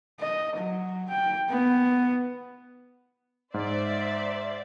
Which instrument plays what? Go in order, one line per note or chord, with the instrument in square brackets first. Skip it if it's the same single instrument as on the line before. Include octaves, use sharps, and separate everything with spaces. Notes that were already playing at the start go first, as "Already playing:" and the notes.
[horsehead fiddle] D#5
F#3
G5
B3
[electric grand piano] G#2 [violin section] C5 D5 E5